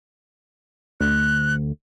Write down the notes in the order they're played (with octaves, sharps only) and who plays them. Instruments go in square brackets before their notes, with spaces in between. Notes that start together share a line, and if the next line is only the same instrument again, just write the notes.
[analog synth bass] D2 [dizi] F#6